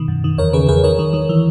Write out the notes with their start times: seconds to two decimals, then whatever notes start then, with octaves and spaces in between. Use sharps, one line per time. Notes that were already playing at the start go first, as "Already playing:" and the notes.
Already playing: B2 D#3
0.08 F#2
0.24 D#3
0.38 E2 A#4 C#5
0.53 C#3 G#4 B4
0.68 E2 G#4 B4
0.84 D#3 A#4 C#5
0.99 D#3
1.13 D#3
1.29 E3